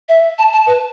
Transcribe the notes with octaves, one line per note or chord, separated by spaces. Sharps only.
E5
A5
A5
B4